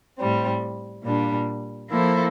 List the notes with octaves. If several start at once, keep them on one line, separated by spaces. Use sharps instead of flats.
A2 G3 C4
A#2 G3 D4
F3 A#3 E4 A4 C5